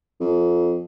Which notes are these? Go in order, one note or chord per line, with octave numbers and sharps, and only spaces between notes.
F2